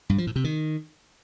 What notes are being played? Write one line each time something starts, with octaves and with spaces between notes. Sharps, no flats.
G2
F3
A2
C3
D#3